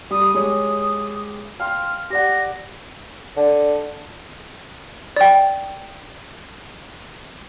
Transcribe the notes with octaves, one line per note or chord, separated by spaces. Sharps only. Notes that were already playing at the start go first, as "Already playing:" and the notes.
G3 D#6
G#3 G4 C#5 D#6
F5 G5 C6 F6
G4 D5 F#5 A#6
D3
D5 G5